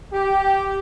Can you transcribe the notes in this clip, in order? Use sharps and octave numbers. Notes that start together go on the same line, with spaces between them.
G4